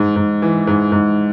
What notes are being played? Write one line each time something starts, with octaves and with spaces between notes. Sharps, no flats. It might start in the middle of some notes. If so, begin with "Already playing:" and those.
Already playing: G#2
G#2
E3
G#2
G#2